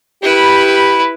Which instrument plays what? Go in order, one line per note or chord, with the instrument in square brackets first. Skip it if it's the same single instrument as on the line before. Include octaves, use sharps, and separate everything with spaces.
[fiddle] E4 B4 [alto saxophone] G4